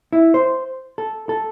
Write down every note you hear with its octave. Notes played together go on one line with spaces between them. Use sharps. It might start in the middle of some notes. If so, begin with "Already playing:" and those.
E4
C5
A4
A4